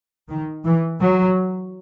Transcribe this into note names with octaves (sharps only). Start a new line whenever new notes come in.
D#3
E3
F#3